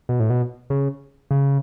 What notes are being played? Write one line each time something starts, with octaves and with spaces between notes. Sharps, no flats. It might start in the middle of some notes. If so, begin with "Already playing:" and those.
B2
A2
B2
C#3
C#3